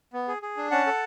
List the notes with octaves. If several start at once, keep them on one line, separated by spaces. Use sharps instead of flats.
B3
G#4
G#4
D4
C#4 F#5 A5
A4